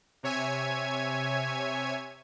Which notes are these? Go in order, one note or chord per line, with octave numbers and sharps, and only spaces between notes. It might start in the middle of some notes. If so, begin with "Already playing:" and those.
C3 C#5 E5 G#5 G#6